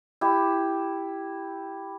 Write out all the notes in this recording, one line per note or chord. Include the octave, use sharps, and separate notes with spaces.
E4 G4